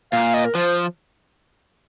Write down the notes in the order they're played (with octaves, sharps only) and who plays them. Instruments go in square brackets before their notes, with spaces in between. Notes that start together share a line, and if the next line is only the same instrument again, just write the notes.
[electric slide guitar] A#2 [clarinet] F5
[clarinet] D#5
A#4
[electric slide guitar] F3 [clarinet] C5